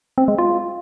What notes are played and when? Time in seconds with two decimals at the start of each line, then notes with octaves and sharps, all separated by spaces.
0.18 C4
0.28 G#3
0.38 F4